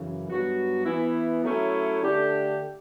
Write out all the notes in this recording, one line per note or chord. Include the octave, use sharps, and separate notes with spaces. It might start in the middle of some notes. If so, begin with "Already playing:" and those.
Already playing: F#2 C#3 E3
G2 F#3 B3 F#4
E3 B3 E4
F#3 A3 C#4 E4
D3 A3 D4 G4